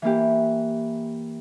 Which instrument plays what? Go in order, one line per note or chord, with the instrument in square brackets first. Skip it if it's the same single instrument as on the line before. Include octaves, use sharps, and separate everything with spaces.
[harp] E3 A#3 E4 G4